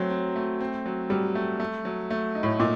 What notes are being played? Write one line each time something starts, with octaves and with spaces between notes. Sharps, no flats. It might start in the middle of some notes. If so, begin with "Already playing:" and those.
Already playing: F#3 A3 C4
C4
A3
C4
F#3
F#3 G3
A3
A3
F#3
A3
D#4
A2
A#2 D#4